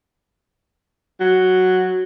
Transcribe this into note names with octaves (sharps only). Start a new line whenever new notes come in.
F#3